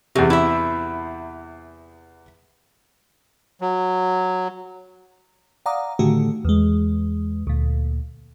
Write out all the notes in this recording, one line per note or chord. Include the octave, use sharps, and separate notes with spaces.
E2 C3 F#3
E4 E5
F#3
D5 F5 F#5 A#5 D6 D#6
A2 D3 D#3 A3 F#4 G4
E2 G#3
D2 A#2